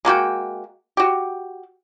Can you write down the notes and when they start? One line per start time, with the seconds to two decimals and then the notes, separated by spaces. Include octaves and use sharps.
0.05 G#3 A#3 F#4 G5
0.97 F#4 G4